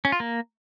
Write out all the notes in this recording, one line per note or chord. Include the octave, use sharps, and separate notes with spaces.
C#4
F4
A#3